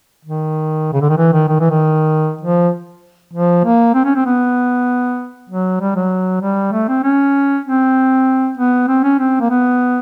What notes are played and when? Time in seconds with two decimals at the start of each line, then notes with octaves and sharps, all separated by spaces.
0.25 D#3
0.93 C#3
1.01 D3
1.09 D#3
1.18 E3
1.33 D#3
1.48 D#3
1.60 E3
1.70 D#3
2.41 F3
3.34 F3
3.64 A#3
3.95 C4
4.05 C#4
4.15 C4
4.26 B3
5.49 F#3
5.80 G3
5.95 F#3
6.41 G3
6.72 A3
6.88 C4
7.04 C#4
7.65 C4
8.57 B3
8.88 C4
9.04 C#4
9.19 C4
9.40 A#3
9.50 B3